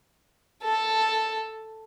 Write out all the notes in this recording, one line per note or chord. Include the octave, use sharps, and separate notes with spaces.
A4